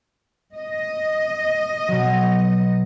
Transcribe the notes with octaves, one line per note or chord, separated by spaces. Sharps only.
D#5
B2 F#3